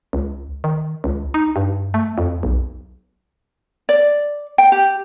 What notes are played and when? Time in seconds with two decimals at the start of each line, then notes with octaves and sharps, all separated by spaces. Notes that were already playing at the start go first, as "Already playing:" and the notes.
0.13 C#2
0.64 D#3
1.04 C#2
1.34 D#4
1.56 G2
1.94 A3
2.18 F2
2.43 B1
3.89 D5
4.58 G5
4.72 G4